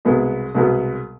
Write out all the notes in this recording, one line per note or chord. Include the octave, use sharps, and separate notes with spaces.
C2 B2 G#3 B3
C2 B2 G#3 B3